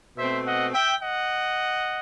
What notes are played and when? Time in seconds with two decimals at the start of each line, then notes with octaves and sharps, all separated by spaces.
0.18 B2 A3 C4 C5 E5
0.46 D#5 F#5
0.74 E5 G5
1.02 D#5 F#5